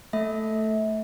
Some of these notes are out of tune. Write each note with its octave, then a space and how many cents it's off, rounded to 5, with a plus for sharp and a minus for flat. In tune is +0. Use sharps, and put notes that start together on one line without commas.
A3 +0 A4 +0 E5 -30